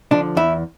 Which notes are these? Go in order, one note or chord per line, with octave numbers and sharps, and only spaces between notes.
D3 F3 D4
E2 E4